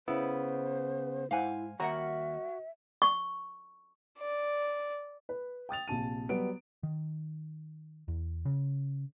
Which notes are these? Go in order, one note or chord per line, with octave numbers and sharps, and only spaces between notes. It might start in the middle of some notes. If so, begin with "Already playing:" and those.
C#3 B3 E4 C5
G#2 E4 C5 F5 F#5 G#5
D#2 G3 F#4 A#4 C#5 E5 F#5 A#5
C#6
D5
B4
G5 D#6 A6 F7
A#1 C3 A5 D#7
F#3 G3 B3 D7
D#3
E2
C#3